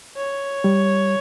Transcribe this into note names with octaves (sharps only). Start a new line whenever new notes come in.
C#5
G3